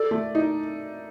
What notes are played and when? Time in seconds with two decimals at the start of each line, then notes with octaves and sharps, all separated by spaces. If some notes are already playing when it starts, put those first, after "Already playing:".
Already playing: A4 D5
0.11 A3
0.35 D#4